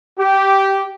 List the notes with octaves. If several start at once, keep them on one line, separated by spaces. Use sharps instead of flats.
G4